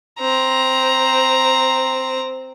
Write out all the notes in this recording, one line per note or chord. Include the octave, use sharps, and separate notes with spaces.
C4 A#5